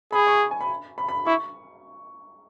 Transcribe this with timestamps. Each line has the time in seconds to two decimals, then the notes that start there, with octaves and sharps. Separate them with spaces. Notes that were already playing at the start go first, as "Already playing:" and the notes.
0.12 G#4 B5
0.27 C#6
0.51 G#5
0.61 B5
0.98 B5
1.09 B5
1.26 E4 C#6